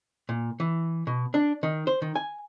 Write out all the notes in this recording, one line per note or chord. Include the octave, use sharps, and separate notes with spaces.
A#2
E3
B2
D4
D#3
C5
D#3
G#5